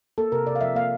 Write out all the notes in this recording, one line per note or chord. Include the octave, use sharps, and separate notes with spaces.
A#3 A4
C3 A#4
C3 D5
F5
F3 E5
A#3 F5